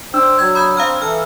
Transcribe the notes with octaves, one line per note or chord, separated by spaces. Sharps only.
D4 C5 G5 E6
F#3 G#6
B5 D#6 G6
C4 F5 A#5 F6
E3 A4 F6